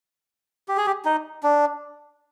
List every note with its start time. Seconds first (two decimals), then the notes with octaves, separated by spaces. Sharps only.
0.68 G4
0.77 G#4
0.86 G4
1.05 D#4
1.43 D4